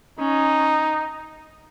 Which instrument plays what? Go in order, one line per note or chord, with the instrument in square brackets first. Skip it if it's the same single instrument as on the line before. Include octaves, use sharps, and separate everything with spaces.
[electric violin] C#4 [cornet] D#4